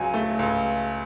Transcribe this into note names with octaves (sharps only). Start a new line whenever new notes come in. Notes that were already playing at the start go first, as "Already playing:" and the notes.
Already playing: C#2 F#3 G#5
A3
C#2